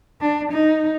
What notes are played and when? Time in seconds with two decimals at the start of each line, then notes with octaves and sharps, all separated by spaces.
0.21 D4
0.52 D#4